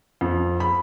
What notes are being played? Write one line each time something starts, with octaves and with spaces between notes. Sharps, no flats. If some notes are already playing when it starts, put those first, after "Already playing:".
F2
B5